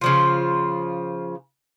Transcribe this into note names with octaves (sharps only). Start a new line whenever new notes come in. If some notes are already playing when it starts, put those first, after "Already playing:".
C#3 F3 F4